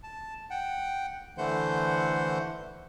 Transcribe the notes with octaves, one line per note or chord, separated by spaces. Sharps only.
A5
F#5 G5
D3 E3 A3 C5 F#5 G6